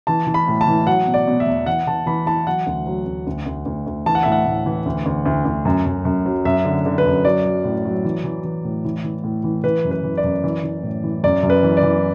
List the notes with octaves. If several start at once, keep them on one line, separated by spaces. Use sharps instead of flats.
E3 A5
E3
B5
A2
A5
E3
F#3 F#5
B2
D5
B2
E5
E2
E3 F#5
E3 A5
E3 B5
E3 A5
F#3 F#5
D2
F#3
D2
D2
D2
D2
D2
E3 A5
F#5
A2 E5
F#5
A2
E3
D2
D2
D2
D2
F#2
F#2
F#2
F#3
F#2 E5
D3
D3
B4
F#2
F#3 D5
F#3
A2
F#3
E3
E3
E3
A2
E3
E3
A2
E3
E3 B4
F#2
B4
E3
D5
F#2
E3
E3
A2
E3
F#2 D5
F#2
B4
E3
D5
E3